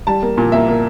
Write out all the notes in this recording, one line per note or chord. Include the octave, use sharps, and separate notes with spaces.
G3 A5
A#3
A#2
A#3 E5
A#3